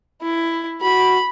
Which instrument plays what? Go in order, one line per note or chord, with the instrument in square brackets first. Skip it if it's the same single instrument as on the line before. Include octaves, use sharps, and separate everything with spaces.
[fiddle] E4
[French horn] F#4 [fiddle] B5